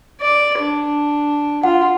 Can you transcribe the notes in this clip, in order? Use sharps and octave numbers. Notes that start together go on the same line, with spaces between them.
D5
D4
F4 F#5